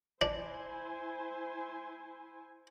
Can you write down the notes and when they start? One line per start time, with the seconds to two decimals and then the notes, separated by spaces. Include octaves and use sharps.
0.21 D4 E4 C5 G#5